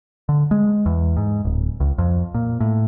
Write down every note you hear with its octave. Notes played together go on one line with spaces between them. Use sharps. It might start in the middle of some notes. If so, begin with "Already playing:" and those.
D3
G#3
E2
G#2
D1
C#2
F2
A#2
A2